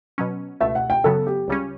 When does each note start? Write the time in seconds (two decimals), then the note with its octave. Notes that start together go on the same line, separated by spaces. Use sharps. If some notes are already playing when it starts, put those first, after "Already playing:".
0.18 B2 F#3 C#4
0.60 C#2 B2 A3 E5
0.75 F#5
0.90 G5
1.04 F#2 C#3 F#3 B3 A4
1.27 G4
1.48 C#2 C#3 G3 C#4